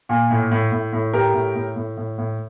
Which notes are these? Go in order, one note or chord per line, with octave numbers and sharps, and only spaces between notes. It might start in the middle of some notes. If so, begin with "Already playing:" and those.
A#2
A2
A2
A2
A2
A2 G4 A#4
A2
A2
A2
A2
A2